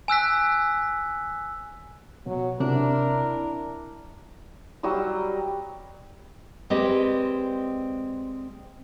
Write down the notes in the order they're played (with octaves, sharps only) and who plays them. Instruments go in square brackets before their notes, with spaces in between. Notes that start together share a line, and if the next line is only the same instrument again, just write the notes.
[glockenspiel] G#5 E6 F#6 B6
[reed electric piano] B2 [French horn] F#3
[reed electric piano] C3 [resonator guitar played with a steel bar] D4 [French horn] E4 [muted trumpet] A#4
[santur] F#3 G3 D#5 E6
[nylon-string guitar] G#3 C4 G4 B4 D5 D#5